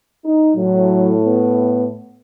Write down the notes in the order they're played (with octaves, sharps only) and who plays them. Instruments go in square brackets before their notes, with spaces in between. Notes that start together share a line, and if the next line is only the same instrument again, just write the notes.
[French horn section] D#4
[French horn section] A2 [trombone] F#3
[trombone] B3